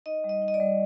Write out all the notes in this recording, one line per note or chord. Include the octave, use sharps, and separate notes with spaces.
D#4 D#5
G3
D#5
D#4
D#5
D5
G3